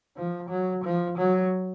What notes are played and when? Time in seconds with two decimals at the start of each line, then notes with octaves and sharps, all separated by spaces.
0.17 F3
0.49 F#3
0.84 F3
1.18 F#3